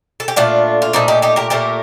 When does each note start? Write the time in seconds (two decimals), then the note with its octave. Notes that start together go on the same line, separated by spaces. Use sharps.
0.20 A4
0.28 G4
0.36 A#2 A3 D4 F4
0.82 F4
0.93 A#2 A3 C4 D#4
1.08 D#4 G4
1.22 D#4 G4
1.36 G4 A#4
1.50 A#2 A3 G4 A#4